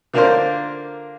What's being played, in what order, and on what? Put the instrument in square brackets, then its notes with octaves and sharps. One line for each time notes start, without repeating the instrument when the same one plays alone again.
[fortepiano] D3 A#3 D4 F4 A#4 C5